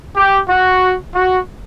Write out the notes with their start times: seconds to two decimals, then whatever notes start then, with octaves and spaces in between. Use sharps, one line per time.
0.16 G4
0.49 F#4
1.15 F#4